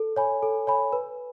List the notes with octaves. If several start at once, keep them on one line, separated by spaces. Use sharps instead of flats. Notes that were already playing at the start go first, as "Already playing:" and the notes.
Already playing: A4
C#5 G#5 B5
A4
C#5 G#5 B5
B4